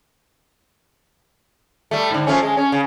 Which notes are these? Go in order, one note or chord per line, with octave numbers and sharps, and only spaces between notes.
G3 A3
G#2 D3
F3 A3 C#4
G#3
C#4
C#3